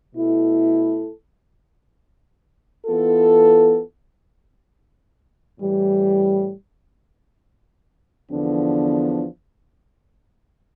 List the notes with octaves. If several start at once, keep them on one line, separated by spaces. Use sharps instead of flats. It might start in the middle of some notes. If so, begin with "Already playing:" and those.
B2 A3 E4 A4
E3 B3 F4 A4
A2 E3 G3
E2 D3 F3 B3 D4